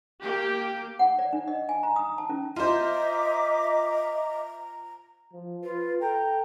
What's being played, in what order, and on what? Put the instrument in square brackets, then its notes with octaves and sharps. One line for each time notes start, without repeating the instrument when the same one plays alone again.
[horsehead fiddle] A#3 [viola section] G4
[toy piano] F#5
D5
D4
D#5
G#5
A#5
D#6
A5
C#4
[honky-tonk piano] F4 C5 [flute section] D#5 E5 D6 [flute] A#5
[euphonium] F3
[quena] F4 [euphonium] B4
[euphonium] A4 [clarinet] G5 [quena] A#5